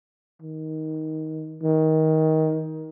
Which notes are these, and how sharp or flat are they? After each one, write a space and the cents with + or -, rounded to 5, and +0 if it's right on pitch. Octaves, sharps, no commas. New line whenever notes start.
D#3 +15
D#3 +20